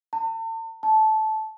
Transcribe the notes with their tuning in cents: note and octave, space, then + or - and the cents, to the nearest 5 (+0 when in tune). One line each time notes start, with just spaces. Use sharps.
A5 +40
A5 -15